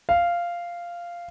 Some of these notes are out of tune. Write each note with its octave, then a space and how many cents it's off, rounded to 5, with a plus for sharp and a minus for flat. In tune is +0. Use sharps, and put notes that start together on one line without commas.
F5 -10